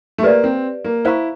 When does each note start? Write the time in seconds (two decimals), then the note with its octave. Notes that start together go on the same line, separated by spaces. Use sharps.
0.18 A3
0.23 A#3 G4 B4 D5 F5
0.44 C4
0.84 A#3
1.05 E4 C5 F5 A#5 C#6